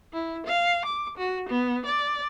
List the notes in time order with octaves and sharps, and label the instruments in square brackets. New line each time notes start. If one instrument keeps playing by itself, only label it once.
[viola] E4
F5
D6
F#4
B3
D5